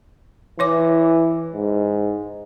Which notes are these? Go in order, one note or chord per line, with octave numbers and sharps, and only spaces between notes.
E3 E4 C#5 D6
G#2